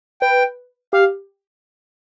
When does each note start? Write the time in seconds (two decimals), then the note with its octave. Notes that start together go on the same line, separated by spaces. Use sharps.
0.22 B4 G5
0.93 G4 F5